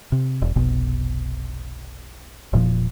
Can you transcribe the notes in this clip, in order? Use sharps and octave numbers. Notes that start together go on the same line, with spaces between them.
C3
E1
F1 B1 B2
E1 A#2 F3